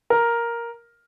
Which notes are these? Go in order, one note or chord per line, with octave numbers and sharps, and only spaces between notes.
A#4